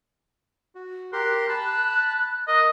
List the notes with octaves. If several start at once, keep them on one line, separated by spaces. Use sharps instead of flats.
F#4
G4 A#4 C6 F#6
A5 B5
A#4 D#5